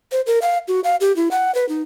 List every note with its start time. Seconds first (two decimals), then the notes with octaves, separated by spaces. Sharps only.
0.12 C5
0.27 A#4
0.42 F5
0.68 F#4
0.84 F5
1.01 G4
1.16 E4
1.31 F#5
1.55 B4
1.69 D#4